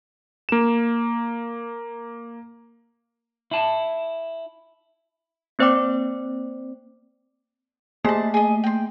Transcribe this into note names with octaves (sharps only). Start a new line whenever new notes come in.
A#3 E7
E4 A5
A#3 C4 C5 D5 G5 D6
A3 A#3 C5 A5
G#4 D#5
G5 C6